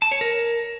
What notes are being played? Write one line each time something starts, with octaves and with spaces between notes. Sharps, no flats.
A5
C#5
A#4